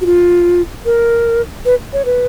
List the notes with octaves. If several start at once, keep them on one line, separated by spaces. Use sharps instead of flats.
F#4
F4
A#4
B4
C#5
B4